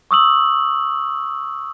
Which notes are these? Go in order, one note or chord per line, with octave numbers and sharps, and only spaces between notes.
C#6 D#6 E6 F#7